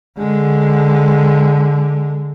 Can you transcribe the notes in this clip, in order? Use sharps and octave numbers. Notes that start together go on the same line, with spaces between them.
D3 G#3